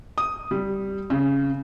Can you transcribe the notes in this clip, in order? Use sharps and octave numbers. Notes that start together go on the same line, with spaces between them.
D#6
G3
C#3